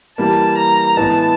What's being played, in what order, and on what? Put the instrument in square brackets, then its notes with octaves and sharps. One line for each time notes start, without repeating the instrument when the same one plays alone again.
[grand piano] E3 G3 A#3 [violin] A5
[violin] A#5
[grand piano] A2 E3 G#3 B3 [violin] A5